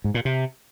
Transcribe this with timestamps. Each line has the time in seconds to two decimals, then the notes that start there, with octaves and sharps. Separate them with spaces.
0.04 G#2
0.14 A#2
0.25 C3